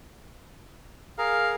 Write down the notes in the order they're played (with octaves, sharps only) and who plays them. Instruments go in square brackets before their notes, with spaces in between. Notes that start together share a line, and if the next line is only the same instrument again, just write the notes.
[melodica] G#4 A#4 A#5 [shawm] F5